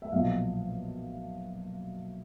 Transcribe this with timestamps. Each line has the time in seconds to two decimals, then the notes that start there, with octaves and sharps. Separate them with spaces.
0.02 E5
0.12 B1 A#2 F3 D#5 F5